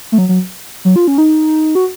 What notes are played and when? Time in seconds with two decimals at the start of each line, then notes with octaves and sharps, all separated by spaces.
0.12 A3
0.18 F#3
0.29 F#3
0.85 F#3
0.96 F4
1.07 C#4
1.18 D#4
1.75 F#4